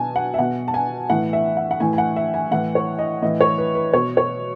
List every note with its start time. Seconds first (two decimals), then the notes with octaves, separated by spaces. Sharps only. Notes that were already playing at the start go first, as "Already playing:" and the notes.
Already playing: B2 G#5 A5
0.16 F#5
0.34 E5
0.39 B2 F#5
0.68 A5
0.74 G#5
1.10 A2 E3 F#5
1.33 E5
1.57 F#5
1.71 F#5
1.80 A2 E3 G#5
1.93 G#5
1.98 F#5
2.16 E5
2.34 G#5
2.51 A2 E3 F#5
2.75 C#5
2.99 D#5
3.22 A2 E3 D#5
3.41 C#5
3.58 B4
3.75 B4
3.93 B2 C#5
4.17 C#5